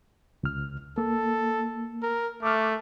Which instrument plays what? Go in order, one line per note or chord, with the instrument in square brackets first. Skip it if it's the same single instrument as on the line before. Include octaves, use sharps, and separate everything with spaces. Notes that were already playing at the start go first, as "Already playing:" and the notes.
[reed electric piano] C#2 F6
[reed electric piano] A#3 [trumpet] A4
[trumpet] A#4
[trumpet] A3 [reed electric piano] D6 F6